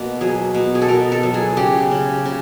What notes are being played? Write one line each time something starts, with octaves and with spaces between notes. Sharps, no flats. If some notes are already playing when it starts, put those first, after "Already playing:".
Already playing: B2 A#3
F#3 G#4
B2
G#4
A4
B2 A#4
A4
F#3
G#4
C#3 G4
C#3
C#3